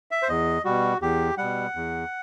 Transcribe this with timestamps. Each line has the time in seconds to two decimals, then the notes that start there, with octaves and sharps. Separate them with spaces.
0.11 E5
0.22 C5
0.29 E2 D#5
0.65 B2 G3 F#4
1.01 E2 G4
1.38 B2 G3 F#5
1.75 E2